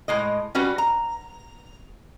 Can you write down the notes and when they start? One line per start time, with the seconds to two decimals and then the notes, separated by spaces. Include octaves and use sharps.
0.08 A2 G#3 D#5
0.55 G3 C#4 F#4 B4
0.78 A#5